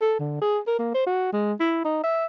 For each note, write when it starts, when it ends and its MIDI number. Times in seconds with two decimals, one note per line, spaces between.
0.01 0.15 69
0.20 0.41 50
0.42 0.59 68
0.67 0.79 70
0.79 0.94 58
0.95 1.06 72
1.07 1.29 66
1.33 1.54 56
1.60 1.80 64
1.85 2.00 63
2.04 2.26 76